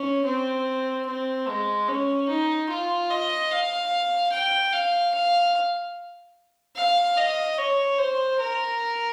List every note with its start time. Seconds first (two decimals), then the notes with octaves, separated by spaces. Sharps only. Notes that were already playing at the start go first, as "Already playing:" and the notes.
Already playing: C#4
0.25 C4
1.07 C4
1.48 G#3
1.88 C#4
2.29 D#4
2.69 F4
3.10 D#5
3.51 F5
4.32 G5
4.72 F5
5.14 F5
6.76 F5
7.17 D#5
7.58 C#5
7.98 C5
8.40 A#4